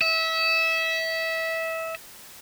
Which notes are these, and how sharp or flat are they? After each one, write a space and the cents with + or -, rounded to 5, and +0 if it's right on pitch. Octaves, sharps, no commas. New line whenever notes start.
E5 -20